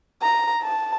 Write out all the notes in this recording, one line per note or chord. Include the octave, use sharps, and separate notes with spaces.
A#5
A5